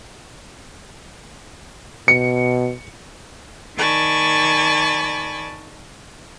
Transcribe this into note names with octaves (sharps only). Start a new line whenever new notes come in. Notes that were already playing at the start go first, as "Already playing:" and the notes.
B2 C#7
D#3 D5 G#5 A5 B5 C#6